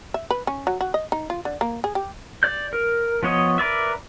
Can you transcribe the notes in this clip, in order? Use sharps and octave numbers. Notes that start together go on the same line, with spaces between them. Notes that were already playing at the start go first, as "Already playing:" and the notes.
E5
B4
C#4
F#3
F#4
D#5
D#4
F4
D3
A#3
G#4
G4
D5 G6
A#4
F3 B3 C#5 D#5
A#4 B4 D5 E5